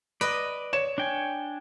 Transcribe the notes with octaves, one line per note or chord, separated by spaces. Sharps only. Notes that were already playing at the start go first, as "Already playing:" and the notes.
B4 D5 D#5
C#5 E7
D4 G5 G#5